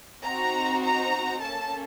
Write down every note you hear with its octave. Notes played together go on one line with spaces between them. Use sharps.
C4 D#4 F#4 A#5
A#5
A#3 C#4 A4 A5